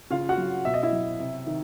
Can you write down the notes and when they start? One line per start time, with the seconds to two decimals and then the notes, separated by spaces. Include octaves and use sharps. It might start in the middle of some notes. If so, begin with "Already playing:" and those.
0.11 C#3 F4 F5
0.29 F#4 F#5
0.38 F#3
0.65 B2 E5
0.74 D#5
0.83 E4 E5
0.92 F#3
1.19 C3
1.47 D#3